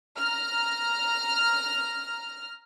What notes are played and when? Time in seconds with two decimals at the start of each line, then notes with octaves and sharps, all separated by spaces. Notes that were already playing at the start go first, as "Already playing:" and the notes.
0.17 A#5 F6